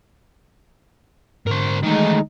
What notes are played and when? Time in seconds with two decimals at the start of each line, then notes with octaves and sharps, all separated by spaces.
1.47 G#2 D3 A#4 C5
1.83 D#3 E3 G#3 A3 D#4 G#5